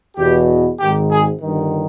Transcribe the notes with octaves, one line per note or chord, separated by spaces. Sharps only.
E2 B2 G4
G#1 G#2 D#3 G4
G#4
G1 G2 D#3